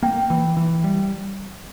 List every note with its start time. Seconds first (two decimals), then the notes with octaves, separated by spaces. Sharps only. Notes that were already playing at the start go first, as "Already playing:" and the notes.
0.02 A#3 G5
0.30 E3
0.57 E3
0.84 G3